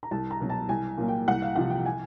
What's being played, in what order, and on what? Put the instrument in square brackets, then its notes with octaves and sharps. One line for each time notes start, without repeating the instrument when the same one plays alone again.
[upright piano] A#5
C2 A5
A#5
B2 F#3
A5
C2 G#5
A#2 F#3 A#3
G5
C2 F#5
F5
C3 F3 F#5
G5
G#5